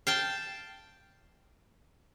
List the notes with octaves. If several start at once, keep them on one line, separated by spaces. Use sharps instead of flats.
F5 G5 A5